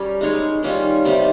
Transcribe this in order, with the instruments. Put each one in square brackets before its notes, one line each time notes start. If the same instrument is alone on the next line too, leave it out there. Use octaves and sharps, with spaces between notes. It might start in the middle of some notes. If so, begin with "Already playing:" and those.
Already playing: [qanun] G3 C#4 G4 A#4
G#3 D#4 G#4 C#5
D#3 G3 C#4 F4
C3 D#3 G3 C4